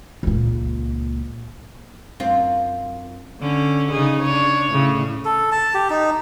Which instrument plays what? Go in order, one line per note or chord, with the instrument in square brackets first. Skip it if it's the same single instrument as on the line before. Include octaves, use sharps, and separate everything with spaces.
[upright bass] C#2 A#2
[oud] F#2 C4 F4
[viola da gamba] D3 C#4
C#3 D#4 G#4
D4 C#5
A2 C#3
[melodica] A4
A5
G4
D#4